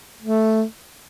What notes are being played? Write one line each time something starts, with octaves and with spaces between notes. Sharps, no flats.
A3